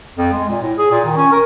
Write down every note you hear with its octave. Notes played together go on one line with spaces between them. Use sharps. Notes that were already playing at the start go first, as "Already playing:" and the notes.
F2
G#3
A#2
A2
G#4
A#2
D#3
C#4
A#4